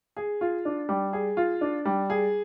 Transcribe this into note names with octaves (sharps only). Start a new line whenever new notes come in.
G#4
F4
D4
G3
G#4
F4
D4
G3
G#4